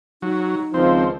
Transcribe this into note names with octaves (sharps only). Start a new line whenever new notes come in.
F#3 D#4
C#2 D#3 F3 C4